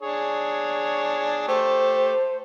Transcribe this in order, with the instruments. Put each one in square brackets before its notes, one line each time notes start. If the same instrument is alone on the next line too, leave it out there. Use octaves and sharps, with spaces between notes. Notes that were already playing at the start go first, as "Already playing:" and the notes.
[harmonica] D4 G#4 C#5
[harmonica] A3 G4 [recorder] C5